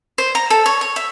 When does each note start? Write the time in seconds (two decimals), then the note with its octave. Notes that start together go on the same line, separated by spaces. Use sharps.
0.18 C5
0.35 A#5
0.50 A4
0.66 C#5
0.81 C#5
0.96 E5